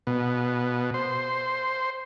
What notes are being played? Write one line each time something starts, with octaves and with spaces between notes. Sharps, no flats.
B2
C5